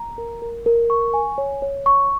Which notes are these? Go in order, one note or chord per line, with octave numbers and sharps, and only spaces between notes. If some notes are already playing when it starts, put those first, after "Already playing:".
Already playing: A#5
A#4
A#4
A#4
C#6
G#5
C#5
C#5
C#6